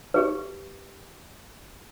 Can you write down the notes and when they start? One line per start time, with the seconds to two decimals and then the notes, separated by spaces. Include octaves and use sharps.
0.14 G4 G#4 B4